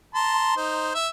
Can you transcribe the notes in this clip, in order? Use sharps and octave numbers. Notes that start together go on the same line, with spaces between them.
A5 A#5 C6
D#4 C5
E5